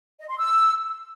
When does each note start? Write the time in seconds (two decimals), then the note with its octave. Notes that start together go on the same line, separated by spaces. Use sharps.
0.20 D#5
0.29 C6
0.38 E6